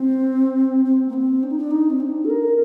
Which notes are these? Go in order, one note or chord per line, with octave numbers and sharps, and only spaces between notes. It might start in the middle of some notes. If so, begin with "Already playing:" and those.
Already playing: C4
C4
A#3
C4
D4
D#4
D4
D#4
C4
D4
A4
A#4